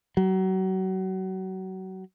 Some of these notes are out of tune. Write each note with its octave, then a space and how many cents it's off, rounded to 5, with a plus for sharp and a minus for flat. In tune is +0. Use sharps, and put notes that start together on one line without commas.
F#3 +30